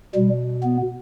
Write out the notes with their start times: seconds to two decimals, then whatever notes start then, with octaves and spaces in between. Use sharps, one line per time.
0.15 B2 G3
0.63 B3